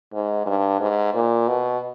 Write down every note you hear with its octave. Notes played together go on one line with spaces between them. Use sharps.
G#2
G2
G#2
A#2
B2